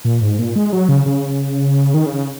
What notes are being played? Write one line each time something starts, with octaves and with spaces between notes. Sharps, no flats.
A#2
G#2
A#2
G#3
F#3
C#3
C#3
D#3
C#3